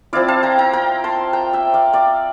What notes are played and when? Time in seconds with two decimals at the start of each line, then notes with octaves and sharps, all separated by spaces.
0.13 F3 C4 E4 D5 F5
0.28 F5 A5
0.43 G5 A#5
0.58 G5 A#5
0.73 G5 A#5
1.04 A5 C6
1.33 G5 A#5
1.53 E5 G5
1.74 D5 F5
1.93 D5 F5